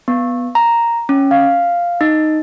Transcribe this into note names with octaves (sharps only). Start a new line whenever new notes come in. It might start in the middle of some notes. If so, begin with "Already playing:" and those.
B3
A#5
C#4
F5
D#4